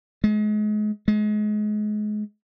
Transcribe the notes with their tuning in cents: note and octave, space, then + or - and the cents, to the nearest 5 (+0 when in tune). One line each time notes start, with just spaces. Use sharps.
G#3 +35
G#3 +30